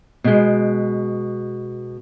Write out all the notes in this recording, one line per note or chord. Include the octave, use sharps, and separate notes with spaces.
B2 G#3